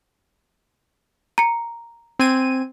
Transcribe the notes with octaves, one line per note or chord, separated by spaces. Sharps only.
A#5 C#7
C4 G#5 D#7